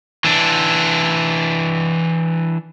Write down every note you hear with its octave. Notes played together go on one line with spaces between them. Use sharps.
E3 D4